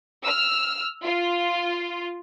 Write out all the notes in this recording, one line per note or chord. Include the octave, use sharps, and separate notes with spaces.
E6 F6
F4